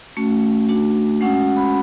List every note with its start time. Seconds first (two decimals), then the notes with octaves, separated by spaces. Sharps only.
0.17 A3 C#4 F#4
0.69 A3 D4 F#4
1.21 G#3 C#4 F#4 F#5
1.56 B5